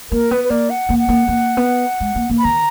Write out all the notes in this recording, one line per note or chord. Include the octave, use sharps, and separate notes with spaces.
A#3 A#4
B3 B4
B4
A#3 D5
F#5
A#3
F#5
A#3
A#3
B3
G#3
A#3
A#3
B5
D#3 A#5